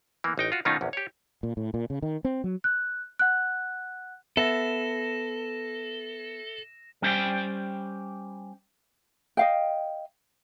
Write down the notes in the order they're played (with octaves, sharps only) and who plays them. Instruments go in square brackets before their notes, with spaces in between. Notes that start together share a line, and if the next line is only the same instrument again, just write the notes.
[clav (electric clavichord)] E3 A#3 B3
A1 D#4 G5
F4 F#4
B2 D#3 A3 C#4 D#4 F4
A#1 E2 C#4
G4 C#5
[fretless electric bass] A#2
A2
A#2
C#3
D#3
C4
F#3
[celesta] F#6
F#5 F#6
[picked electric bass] B3 [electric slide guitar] A4 [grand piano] E5 [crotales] A#6 E7
[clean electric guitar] G3 C#4 C5 D5 G5
[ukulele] D#5 F5 G5